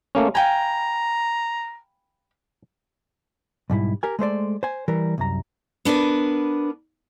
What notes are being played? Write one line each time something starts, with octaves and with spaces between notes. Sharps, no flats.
A3 A#3 C#4
F5 G5 G#5 A#5 B5
B1 G#2 G3 E4
G4 A#4 G#5
G#3 A3 C5 D5
C5 G#5
E3 G3 A#4
C2 F#2 A#5
B3 D4 A#4 B4